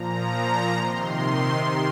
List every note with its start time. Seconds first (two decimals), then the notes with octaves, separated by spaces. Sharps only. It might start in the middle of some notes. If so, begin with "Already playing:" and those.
Already playing: A#2 F3 A#5
0.76 C3 C6
0.81 D#3